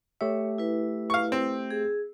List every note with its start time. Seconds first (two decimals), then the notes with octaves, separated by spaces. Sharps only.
0.21 A3 G4 C#5 E5
0.58 E4 B4
1.10 F5 C#6
1.32 C4
1.71 G#4